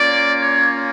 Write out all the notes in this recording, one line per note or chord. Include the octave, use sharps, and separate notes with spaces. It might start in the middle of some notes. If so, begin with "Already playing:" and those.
Already playing: A#3 C#4 F4 D5
C#5